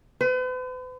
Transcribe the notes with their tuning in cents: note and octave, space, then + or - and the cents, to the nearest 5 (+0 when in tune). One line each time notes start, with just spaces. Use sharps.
B4 +45